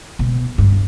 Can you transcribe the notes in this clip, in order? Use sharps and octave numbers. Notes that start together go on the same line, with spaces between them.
B2
G2